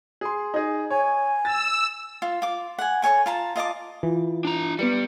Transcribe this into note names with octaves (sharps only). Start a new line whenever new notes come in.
G#4 C6
D#4 G#4
C#5 G#5
E6 A6
F4
F4 D6
F#5 G#5
A4 C#5 G#5 C#6
F4 A5 A#5
F4 D#5 A5 D6
E3 F4
D4 A#5
G3 B3 B4 C#7